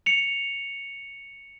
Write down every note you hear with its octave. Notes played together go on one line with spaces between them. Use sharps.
C#7 F7